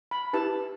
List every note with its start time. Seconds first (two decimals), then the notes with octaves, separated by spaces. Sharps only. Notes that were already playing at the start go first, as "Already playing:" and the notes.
0.11 B5
0.33 E4 G4 B4 A5